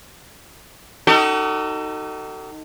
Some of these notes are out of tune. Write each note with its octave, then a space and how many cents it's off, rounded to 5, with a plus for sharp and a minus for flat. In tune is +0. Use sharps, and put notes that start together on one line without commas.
D#4 +0 F#4 +45 A4 +30